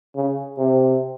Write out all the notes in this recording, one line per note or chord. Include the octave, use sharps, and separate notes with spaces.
C#3
C3